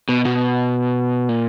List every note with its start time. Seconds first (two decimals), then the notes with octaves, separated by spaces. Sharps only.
0.09 B2
0.25 B2
1.29 A#2